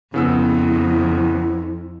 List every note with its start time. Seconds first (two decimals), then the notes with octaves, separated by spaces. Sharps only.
0.14 F2 C#3 B3 E4 E6